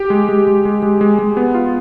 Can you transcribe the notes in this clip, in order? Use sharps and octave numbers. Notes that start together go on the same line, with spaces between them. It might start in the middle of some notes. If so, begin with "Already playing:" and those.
Already playing: G4
G#3
G#3
G#3
G#3
G#3
G#3
G#3
B3
F4